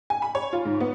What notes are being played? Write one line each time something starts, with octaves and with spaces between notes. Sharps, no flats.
G#5
B5
C#5
F4
G#2
B3